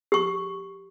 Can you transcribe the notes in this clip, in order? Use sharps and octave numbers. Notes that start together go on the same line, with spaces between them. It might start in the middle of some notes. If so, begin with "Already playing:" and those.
G4 C#6